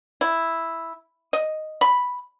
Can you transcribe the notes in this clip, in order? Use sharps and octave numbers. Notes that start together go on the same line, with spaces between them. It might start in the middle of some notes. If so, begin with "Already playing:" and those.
E4
D#5
B5